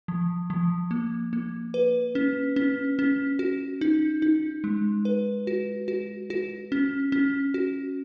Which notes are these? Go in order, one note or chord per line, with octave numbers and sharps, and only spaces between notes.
F3
F3
A#3
A#3
B4
C#4
C#4
C#4
F#4
D#4
D#4
G#3
B4
F#4
F#4
F#4
C#4
C#4
F#4